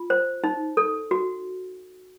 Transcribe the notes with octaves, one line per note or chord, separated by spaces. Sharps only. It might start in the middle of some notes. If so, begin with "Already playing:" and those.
Already playing: F4
C5
D#4
A4
F#4